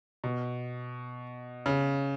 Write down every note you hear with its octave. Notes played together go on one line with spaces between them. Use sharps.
B2
C#3